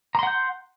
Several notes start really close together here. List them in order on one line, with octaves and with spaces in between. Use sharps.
A#5 C6 F#5 G6